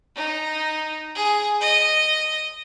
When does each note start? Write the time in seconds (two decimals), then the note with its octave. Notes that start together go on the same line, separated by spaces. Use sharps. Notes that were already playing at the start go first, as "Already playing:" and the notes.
0.16 D#4
1.15 G#4
1.61 D#5